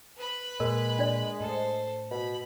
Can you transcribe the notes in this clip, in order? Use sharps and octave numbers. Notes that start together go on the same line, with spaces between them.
B4 B5
A#2 G#3 A#4
D4 D5
A2 A4 C5
B2 B5